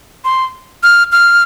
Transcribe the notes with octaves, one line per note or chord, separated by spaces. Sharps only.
C6
F6
F6